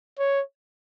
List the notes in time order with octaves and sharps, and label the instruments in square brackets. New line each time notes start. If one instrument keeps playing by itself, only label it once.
[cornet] C#5